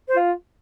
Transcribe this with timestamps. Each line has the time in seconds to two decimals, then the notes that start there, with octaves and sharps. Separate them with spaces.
0.08 C5
0.16 F4